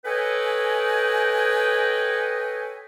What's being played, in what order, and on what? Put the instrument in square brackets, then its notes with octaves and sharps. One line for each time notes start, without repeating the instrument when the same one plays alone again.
[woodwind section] A4 B4 C#5 D#5 G5 G#5